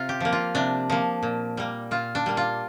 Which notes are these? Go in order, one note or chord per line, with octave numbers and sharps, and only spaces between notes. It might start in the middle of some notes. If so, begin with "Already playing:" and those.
Already playing: C3 F4
G4
F3 A#3
F4
C3 D4
F3 A#3
A#2
G3 A#3
A#2 F4
D4
G3 A#3
F4